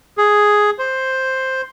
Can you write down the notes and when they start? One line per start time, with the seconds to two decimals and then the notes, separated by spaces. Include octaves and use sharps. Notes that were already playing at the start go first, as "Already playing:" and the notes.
0.18 G#4
0.79 C5